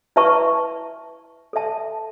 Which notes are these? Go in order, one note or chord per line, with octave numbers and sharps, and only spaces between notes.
E4 B4 E5 A5 C#6
A4 E5 A5